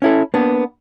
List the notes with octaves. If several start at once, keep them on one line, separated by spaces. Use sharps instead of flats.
C#4 E4 A4
A#3 B3 D4